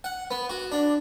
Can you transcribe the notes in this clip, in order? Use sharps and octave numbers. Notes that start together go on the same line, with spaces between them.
F#5
B3
F#4
D4